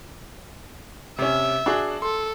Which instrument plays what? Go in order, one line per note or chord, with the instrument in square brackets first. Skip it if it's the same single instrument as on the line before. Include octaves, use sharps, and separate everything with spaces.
[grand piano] C3 C#4 [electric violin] E5
[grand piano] D4 F#4 G#4
[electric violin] A4 [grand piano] C6